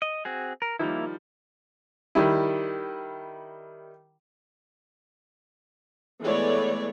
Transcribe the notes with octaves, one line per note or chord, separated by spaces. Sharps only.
D#5
C4 F#4 G#4
A#4
D#3 F3 G3 A#3 E4
D#3 G3 E4
E3 G#3 A3 B3 C#5 D5